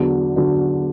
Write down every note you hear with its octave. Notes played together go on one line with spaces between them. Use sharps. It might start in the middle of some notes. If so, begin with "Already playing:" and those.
Already playing: E2 D3 F#3
D3 F#3